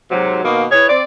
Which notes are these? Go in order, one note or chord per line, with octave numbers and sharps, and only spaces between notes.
G#2 C3 F#3
B2 D#3 A#3
E4 G#4 B4 C#5
C4 D5